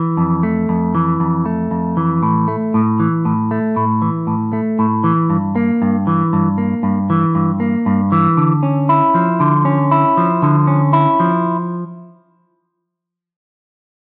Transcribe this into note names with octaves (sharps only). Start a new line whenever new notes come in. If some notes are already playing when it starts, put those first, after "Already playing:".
Already playing: E3
F2
A3
F2
E3
F2
A3
F2
E3
A2
A3
A2
E3
A2
A3
A2
E3
A2
A3
A2
E3
G2
A#3
G2
E3
G2
A#3
G2
E3
G2
A#3
G2
E3
D3
C#4
E4
F3
D3
C#4
E4
F3
D3
C#4
E4
F3